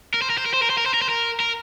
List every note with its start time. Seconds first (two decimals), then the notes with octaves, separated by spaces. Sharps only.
0.14 A#4
0.22 C5
0.30 A#4
0.38 C5
0.46 A#4
0.54 C5
0.62 A#4
0.70 C5
0.78 A#4
0.86 C5
0.94 A#4
1.02 C5
1.09 A#4
1.40 A#4